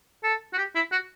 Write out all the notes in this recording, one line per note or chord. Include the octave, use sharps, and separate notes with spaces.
A4
F#4
G4
E4
F#4